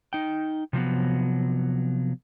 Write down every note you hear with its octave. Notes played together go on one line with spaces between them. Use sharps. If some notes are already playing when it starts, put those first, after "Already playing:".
D#4 G5
C3 F3 F#3 B3